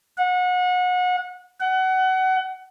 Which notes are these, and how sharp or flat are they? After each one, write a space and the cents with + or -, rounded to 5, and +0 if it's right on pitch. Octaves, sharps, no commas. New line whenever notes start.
F#5 -30
F#5 +25